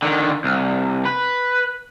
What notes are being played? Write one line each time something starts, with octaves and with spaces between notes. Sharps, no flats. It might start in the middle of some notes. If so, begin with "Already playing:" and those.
D3 D#3
C2
B4